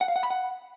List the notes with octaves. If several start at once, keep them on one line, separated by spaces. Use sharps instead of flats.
F#5
F5
F#5
B5
F#5